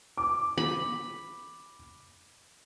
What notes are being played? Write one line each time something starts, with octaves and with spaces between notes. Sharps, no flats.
D6
B5